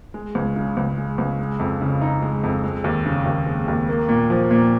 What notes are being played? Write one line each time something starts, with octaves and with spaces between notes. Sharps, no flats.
G#3
C#2
C#3
C#2
G#3
C#2
G#3
F2
C#3
D#4
G#3
F2
G#3
D#2
C#3
D#2
G#3
D#2
A#3
A#2
F3
A#2